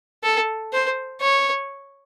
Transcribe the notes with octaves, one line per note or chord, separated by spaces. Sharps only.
A4
C5
C#5